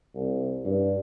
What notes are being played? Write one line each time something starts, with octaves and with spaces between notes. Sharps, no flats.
C2
G2